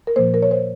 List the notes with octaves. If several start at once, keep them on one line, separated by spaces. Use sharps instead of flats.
A#4
A#2 F3 A#3 C5
A#4
C#5
C5